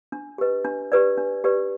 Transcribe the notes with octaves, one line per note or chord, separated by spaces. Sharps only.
D4
G4 B4 D#5
D4
G4 B4 D5
D4
G4 B4 D5